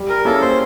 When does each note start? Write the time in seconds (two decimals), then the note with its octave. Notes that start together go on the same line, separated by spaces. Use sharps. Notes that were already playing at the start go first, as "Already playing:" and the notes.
Already playing: G3
0.09 A#4
0.25 A#3 C#4 E4 G#4 A4
0.42 C5